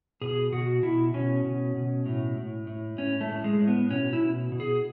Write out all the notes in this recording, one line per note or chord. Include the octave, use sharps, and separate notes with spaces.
B2 G#4
B2 F#4
B2 E4
B2 C#4
B2
B2
A2
A2
A2
A2 C#4
A3
A2
G#3
A2
B3
B2 C#4
E4
B2
B2
G#4